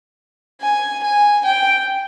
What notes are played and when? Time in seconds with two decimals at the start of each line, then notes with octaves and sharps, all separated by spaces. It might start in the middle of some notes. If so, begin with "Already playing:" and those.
0.61 G#5
1.03 G#5
1.45 G5